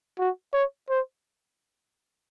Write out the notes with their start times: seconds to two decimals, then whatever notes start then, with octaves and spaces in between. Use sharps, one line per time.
0.19 F#4
0.53 C#5
0.90 C5